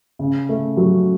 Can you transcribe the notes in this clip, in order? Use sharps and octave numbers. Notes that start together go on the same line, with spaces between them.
C#3
A3
F#3